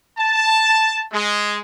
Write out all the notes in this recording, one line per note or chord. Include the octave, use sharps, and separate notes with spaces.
A5
G#3